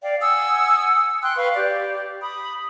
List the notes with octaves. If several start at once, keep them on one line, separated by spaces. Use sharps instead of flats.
D5 F5 G5
F#5 G#5 D#6 E6
G5 C6 F#6
B4 F5 C#6
G4 D5
B5 D#6